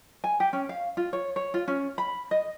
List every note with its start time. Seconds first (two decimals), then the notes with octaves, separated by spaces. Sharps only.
0.24 G#5
0.40 G4
0.53 C#4
0.69 F5
0.97 F4
1.13 C#5
1.36 C#5
1.54 F4
1.68 C#4
1.98 B5
2.31 D#5